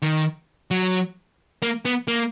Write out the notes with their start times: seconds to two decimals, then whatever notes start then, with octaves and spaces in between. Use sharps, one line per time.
0.02 D#3
0.71 F#3
1.62 A#3
1.85 B3
2.08 A#3